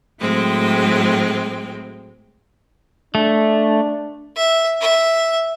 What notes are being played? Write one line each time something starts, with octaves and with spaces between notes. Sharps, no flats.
A2 F#3 G#3 C4 G5
A3 D4
E5
E5